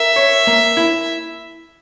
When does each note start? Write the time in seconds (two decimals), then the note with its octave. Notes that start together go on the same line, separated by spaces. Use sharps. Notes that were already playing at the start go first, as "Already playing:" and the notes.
Already playing: A#4 E5
0.16 C#5
0.47 A#3
0.77 E4